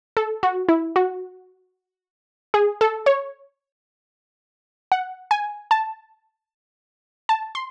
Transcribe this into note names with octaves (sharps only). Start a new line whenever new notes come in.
A4
F#4
E4
F#4
G#4
A4
C#5
F#5
G#5
A5
A5
C6